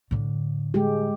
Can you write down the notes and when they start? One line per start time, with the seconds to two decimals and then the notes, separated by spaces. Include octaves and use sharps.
0.11 A2 D3
0.74 G#3 G4